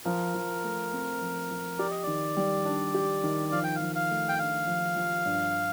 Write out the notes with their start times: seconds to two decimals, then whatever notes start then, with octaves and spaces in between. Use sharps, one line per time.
0.05 F3 A#4
0.34 F3
0.64 A3
0.92 C4
1.21 F3
1.51 F3
1.79 G4 D5
1.91 D#5
2.03 D#3 D5
2.37 G3
2.65 D4
2.94 G4
3.23 D#3
3.52 F3 F5
3.64 G5
3.76 F3 F5
3.95 F5
4.11 A3
4.29 G5
4.39 D4 F5
4.67 F3
4.96 F3
5.26 G2